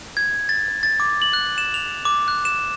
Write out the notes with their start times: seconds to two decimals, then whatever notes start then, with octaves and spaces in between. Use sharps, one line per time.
0.17 G#6
0.49 A6
0.83 A6
1.00 D6
1.22 F#7
1.33 F#6
1.58 E7
1.74 F7
2.05 D6
2.28 F#6
2.45 E7